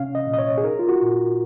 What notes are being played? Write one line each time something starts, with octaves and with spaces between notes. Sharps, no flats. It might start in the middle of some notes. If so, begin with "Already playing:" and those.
Already playing: C3 C#4 F5
D#5
A#2
D#5
C#5
G#4
D#4 A#4
F4
F#4
A#2